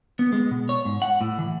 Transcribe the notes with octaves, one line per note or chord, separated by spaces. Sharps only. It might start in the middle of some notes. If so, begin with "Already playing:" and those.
B3
G#3
B2
C#5
G#2
F#5
A2
E3